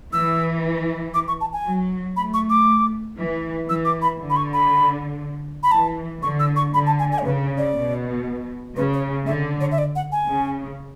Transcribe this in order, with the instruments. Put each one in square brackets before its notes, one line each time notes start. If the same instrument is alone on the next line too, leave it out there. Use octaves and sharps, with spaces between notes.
[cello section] E3 [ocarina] E6
[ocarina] D6
C#6
A5
G#5
[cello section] F#3
[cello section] A3 [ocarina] B5
[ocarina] C#6
D6
[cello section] E3
[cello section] E3 [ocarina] E6
[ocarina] D6
B5
[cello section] D3
[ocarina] B5
C#6
B5
B5
[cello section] E3 [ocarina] A5
[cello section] D3 [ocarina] C#6
[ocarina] E6
C#6
[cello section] D3 [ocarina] B5
[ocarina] A5
G#5
G#5
C#5
[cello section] C#3 [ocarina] B4
[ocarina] D5
[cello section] B2
[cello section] C#3 [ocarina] B4
[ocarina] C#5
[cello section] D3 [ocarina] E5
[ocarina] C#5
E5
D5
F#5
G#5
[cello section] C#3